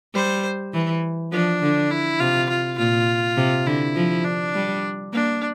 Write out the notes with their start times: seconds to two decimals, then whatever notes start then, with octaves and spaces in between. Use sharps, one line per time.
0.14 G3 C5
0.74 E3
1.32 F3 D4
1.62 D3
1.91 E4
2.20 C3 F4
2.49 F4
2.78 A#2 F4
3.37 C3
3.66 D3 E4
3.95 F3
4.25 D4
4.54 G3
5.13 A#3 D4